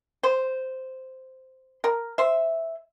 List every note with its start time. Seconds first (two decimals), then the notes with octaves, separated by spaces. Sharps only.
0.23 C5
1.84 A#4
2.18 C5 E5